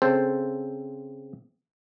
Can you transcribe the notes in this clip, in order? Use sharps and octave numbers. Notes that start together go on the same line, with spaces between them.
C#3 C4 A4 C5